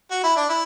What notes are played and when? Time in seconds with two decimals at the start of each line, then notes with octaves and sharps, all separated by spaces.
0.11 F#4
0.24 E4
0.37 D4
0.49 E4